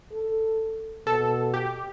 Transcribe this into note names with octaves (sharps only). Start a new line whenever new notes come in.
A4
B2 A4
G4